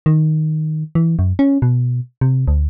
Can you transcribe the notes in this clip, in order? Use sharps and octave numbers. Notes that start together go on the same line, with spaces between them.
D#3
E3
F#2
C#4
B2
C3
D2